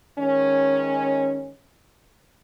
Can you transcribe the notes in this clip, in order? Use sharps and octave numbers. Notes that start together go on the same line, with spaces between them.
D#3 G#3 C#4